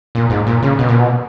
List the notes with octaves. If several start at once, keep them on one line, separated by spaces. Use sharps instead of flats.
A#2
G#2
A#2
C#3
B2
A#2
B2